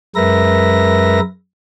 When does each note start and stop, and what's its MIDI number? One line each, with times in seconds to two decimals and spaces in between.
0.16 1.20 42
0.16 1.20 56
0.16 1.20 70
0.16 1.20 71
0.16 1.20 76
0.16 1.20 94